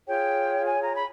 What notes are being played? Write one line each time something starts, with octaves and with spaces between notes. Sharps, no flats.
F4 G#4 C#5 G5
G#5
A#5
B5